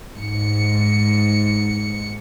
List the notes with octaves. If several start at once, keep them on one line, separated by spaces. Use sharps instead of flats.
G#2 C#7